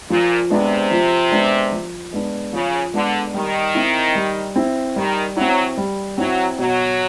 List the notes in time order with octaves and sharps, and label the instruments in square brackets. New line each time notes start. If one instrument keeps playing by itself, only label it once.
[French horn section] A#2 [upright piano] F3
[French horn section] C3 [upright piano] G#3 B3 D4
[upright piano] F3
G#3 B3 D4
F3
G#3 B3 D4
[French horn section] C#3 [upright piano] F3
[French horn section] D3 [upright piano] G#3 B3 D4
[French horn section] D#3 [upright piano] G3
[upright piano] C4 E4
G3
C4 E4
[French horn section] D#3 [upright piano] G3
[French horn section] F#3 [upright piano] C4 E4
[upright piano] G3
[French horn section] F#3 [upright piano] C4 E4
[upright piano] B2 [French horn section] F#3